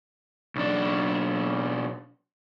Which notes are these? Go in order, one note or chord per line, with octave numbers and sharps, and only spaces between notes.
B1 D4